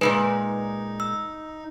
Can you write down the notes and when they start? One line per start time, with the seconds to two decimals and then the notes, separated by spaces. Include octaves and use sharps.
0.01 A#2 C#3 G#3 D#4 B4
1.00 E6